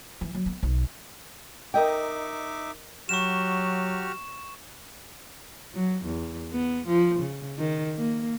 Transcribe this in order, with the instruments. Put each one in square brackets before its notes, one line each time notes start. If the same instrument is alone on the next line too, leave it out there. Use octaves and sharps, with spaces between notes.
[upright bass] E3
F#3
B3
B1
[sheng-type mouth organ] D#4 E5 D6 [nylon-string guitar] A#4 D#5 G5
[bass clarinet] F#3 [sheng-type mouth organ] F#4 G4 F6 [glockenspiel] C#6 E7
[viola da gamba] F#3
E2
B3
F3
C#3
D#3
A#3